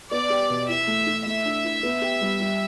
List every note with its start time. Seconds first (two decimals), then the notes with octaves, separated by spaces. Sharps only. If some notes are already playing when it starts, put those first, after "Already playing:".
0.11 B3 D5
0.30 G4
0.50 B2
0.68 E3 E5
0.87 A3
1.07 E4
1.26 A3 E5
1.45 D4
1.64 E3
1.83 B3
2.02 G4
2.21 G3
2.40 G3